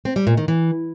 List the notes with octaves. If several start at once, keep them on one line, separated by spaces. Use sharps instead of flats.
C4
G3
A#2
D#3
E3